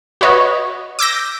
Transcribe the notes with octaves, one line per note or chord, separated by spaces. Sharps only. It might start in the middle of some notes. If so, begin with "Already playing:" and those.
F#4 B4 C#5 D#5
D6 E6 G6 A#6